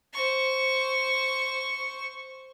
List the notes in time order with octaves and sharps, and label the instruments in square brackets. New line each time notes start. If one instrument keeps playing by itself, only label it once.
[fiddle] C5 C#6